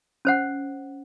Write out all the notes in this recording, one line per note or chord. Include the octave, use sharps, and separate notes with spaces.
C#4 C5 F#5